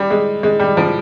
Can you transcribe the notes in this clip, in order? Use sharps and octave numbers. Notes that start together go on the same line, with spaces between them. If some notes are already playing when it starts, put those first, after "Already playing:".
Already playing: G3
G#3
G#3
G3
F3